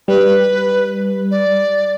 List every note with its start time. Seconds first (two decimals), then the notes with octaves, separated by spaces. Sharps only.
0.08 G3 B4
1.31 D5